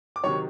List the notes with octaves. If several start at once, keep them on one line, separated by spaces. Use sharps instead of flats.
D6
C3 D#3 F#3 C#5 C#6